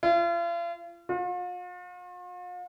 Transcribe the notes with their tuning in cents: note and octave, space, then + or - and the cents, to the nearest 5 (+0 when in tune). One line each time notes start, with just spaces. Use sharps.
F4 -40
F4 +45